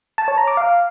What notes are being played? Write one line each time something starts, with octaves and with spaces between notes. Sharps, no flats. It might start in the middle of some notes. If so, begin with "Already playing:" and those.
A5
C#5
A#5
D6
F5